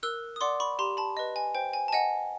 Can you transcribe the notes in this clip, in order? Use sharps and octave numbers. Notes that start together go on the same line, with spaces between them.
A#4 E6 F#6
D#6
D5 F#5 C6 D6
B5 C#6
G4 A#5 C6
A5 B5
B4 D#5
G#5
C5 G5
G#5
A5
D#5 F#5 G#5